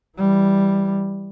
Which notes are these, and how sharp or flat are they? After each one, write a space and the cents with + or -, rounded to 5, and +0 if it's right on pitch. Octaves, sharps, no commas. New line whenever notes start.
E3 +5 G3 +0